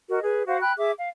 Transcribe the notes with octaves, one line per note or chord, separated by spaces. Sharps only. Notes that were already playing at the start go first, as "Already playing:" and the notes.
F#4 A#4 D#5
G#4 B4
F#4 C5 F5 F#5
G5 B5 F#6
G#4 E5 D6
F5